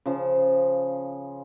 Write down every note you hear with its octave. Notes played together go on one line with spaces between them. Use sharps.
C#3 F3